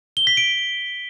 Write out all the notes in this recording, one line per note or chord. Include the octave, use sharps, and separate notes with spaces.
G7
B6
D7